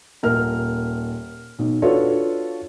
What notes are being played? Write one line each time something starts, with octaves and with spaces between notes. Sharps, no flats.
D#1 A#4 F6
B1
D4 F4 F#4 A4 B4 C#5